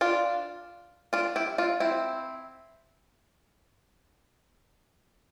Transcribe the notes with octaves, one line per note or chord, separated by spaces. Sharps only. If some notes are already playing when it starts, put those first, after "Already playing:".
D4 F4
D4 F4
E4 G4
D4 F4
C4 E4